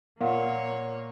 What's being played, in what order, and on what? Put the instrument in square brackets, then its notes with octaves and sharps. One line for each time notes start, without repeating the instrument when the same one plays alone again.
[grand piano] A#2 [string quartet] A#3 C#5 [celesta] A#4 F5 F#5